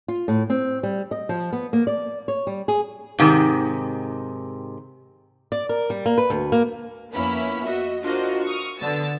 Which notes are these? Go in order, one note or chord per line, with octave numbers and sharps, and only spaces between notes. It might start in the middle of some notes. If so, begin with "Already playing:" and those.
F4
A2
C4
G3
D#5
F3
B3
A#3
D5
C#5
G3
G#4
G#2 C3 D#3
D5
A#4
G3
A#3
B4
D2
A#3
F2 A#3 B3 C#4 E4 B5
F#4 D#5 E5
D4 F4 F#4 A#4 C5 D#5
C#6 D#6 F6
D3 B3 E6 A6